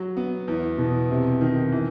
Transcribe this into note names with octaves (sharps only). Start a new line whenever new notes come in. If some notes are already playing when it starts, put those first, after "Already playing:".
Already playing: F#3
B3
E2
B2
C3
D#3
E3